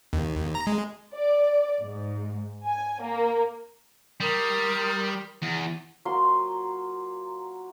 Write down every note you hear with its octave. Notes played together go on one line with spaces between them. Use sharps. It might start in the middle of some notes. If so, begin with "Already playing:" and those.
D#2
A#5
G#3
D5
G#2
G#5
A#3
G3 A#4 C6 D#6
E2
F#3 A#3 F4 C6